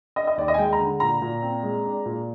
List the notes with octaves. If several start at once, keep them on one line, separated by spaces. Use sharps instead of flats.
D4 D#5
D#5
D#2 D5
D#5
G#5
G#3 G5
A#5
D3
A#2 A#5
A#2
C4
G#3
D4
A#2